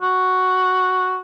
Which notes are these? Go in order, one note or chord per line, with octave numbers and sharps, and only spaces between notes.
F#4